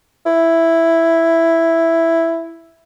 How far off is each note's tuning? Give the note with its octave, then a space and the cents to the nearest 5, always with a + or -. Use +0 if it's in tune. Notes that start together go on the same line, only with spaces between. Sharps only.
E4 +5